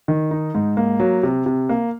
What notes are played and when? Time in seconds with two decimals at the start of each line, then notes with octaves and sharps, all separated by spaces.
0.08 D#3
0.31 D#4
0.55 G#2
0.77 A#3
1.00 F#3
1.23 C3
1.46 C3
1.69 A#3